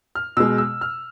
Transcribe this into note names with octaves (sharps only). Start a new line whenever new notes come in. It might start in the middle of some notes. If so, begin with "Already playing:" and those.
F6
B2 G#3 E6
E6
F6